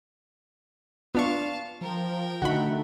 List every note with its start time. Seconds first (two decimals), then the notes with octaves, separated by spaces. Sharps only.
1.15 B3 D4 F4 F5 A5 C#6
1.81 F3 A#4 G5
2.42 D3 A3 D#4 F#4 F#5 B5